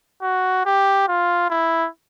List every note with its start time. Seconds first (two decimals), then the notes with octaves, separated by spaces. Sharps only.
0.22 F#4
0.65 G4
1.08 F4
1.49 E4